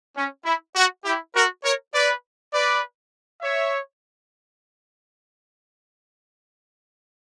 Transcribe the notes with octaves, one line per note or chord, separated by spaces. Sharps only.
C#4
E4
F#4
E4 G4
F#4 A#4
A#4 C#5
B4 D5
B4 D5
C#5 E5